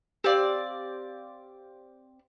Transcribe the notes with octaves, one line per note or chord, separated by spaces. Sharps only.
C4 G4 D5 F5 D6